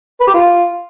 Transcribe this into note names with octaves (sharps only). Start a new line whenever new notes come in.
B4
G4
F4